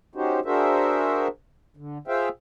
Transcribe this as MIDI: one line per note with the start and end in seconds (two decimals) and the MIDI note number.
0.15 0.40 61
0.15 0.40 63
0.15 0.40 66
0.15 0.40 67
0.15 0.40 72
0.45 1.28 62
0.45 1.28 66
0.45 1.28 68
0.45 1.28 70
0.45 1.28 72
0.45 1.28 76
1.77 1.98 50
2.08 2.29 65
2.08 2.29 68
2.08 2.29 72
2.08 2.29 76
2.08 2.29 77
2.08 2.29 79